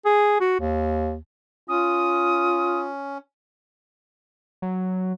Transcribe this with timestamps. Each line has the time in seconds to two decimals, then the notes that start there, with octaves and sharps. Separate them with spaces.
0.05 G#4
0.40 F#4
0.60 D#2
1.68 C#4 F4 D#6
4.62 F#3